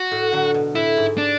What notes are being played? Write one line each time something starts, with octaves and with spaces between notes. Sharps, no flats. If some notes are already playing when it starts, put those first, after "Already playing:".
Already playing: F#4
A2
D3 F#3
B2
A2 E4
G#2
D4